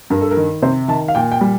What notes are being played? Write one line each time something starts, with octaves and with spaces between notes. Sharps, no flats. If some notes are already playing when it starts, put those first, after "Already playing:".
G2 A#4
A4
A#4
D#3
C3 C5
D#3 A5
F5
A#2 G5
G5
G3